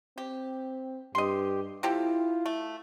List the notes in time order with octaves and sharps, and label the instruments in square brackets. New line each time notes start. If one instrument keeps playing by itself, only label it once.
[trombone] C4 [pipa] G4
[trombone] G2 [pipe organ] G4 [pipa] D#5 C6
[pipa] C4 G4 A4 [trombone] E4 [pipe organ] F4
[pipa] A3